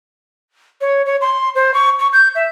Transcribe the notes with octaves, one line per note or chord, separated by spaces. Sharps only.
C#5
C#5
C6
C5
C#6
C#6
G6
E5